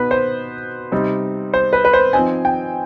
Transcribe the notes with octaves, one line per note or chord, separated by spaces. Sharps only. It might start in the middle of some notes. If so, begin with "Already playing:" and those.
Already playing: B2 B3 D#4 B4
C5
C3 G3 C4 D#4
C5
B4
B4
C5
F3 C4 D#4 G#5
G5